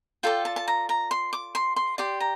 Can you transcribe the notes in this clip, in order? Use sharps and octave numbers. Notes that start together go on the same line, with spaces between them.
F4 A4 D5 G5
A5
A5
A#5
A#5
C6
D6
C6
C6
G4 D5 C6
A#5